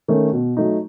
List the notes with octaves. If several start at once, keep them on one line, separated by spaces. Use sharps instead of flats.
D#3 A3 C#4
B2
F#3 A3 D#4